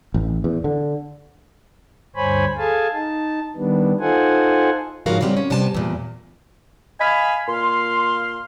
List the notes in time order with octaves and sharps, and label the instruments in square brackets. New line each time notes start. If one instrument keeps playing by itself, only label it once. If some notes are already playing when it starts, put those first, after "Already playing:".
[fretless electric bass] A1
E2
D3
[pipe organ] D2 G2 C5 C#5 G#5 B5
G#4 A4 F5 G#5 A5
D#4 A5
D#3 G3 B3 D4
D#4 F4 A4 C5 F#5 G#5
[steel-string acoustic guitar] G#2 C#3 F3 F#4 A#4 F5
C#3 F#3 G3 C4
C#4
C3 G3 B3 G#5 A5
E2 A#2
[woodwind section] D#5 F5 G#5 B5
A#2 F5 C6